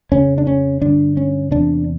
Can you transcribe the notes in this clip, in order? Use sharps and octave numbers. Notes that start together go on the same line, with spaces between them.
F2 C#3 C#4
D4
C#4
G2 D3 D4
C#4
E2 C3 D4